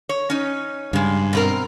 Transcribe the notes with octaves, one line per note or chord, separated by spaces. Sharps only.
C#5
C#4 D#4
G2 C#3 G#3
B2 C4 A#4